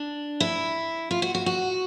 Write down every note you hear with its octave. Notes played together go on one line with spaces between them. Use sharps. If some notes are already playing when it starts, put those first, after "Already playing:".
Already playing: D4
E4
F4
F#4
F#4
F#4